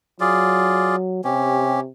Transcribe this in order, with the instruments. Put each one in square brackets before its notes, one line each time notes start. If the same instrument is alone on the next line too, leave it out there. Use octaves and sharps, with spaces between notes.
[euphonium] F#3 [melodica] F4 G#4 D5
[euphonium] C3 [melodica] C#4 G4